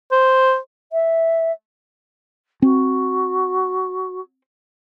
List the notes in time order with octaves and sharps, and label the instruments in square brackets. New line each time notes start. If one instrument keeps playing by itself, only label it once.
[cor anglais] C5
[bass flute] E5
[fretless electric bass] C4 [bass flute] F#4